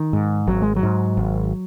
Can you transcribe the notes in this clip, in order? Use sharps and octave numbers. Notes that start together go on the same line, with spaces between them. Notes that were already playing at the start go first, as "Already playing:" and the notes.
Already playing: D#3
G#2
G#1 F#3
G#3
F#3
G#2
G#1